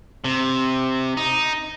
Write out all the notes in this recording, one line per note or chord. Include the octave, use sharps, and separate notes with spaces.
C3
D#4